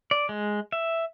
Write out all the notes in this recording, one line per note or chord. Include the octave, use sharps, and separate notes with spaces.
D5
G#3
E5